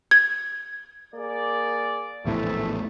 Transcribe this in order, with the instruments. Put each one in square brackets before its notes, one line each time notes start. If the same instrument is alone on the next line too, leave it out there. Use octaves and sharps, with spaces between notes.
[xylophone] G#6
[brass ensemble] A#3 G#4 D5
[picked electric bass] A#1 E2 A2 [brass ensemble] C3 E3 A3